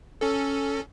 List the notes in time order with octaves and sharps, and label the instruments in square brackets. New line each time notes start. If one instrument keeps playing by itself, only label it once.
[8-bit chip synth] C#4 A4